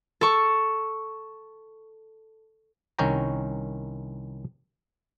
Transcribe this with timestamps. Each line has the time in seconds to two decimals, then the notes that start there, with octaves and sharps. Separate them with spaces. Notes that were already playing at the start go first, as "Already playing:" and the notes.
0.21 A4 C#6
2.99 C2 D#3 C#4 C#5 G5 A#5